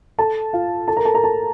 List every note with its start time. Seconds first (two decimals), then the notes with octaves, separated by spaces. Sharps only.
0.18 A4 A5
0.53 F4 F5
0.88 A4 A5
0.97 A#4 A#5
1.05 A4 A5
1.14 A#4 A#5
1.23 A4 A5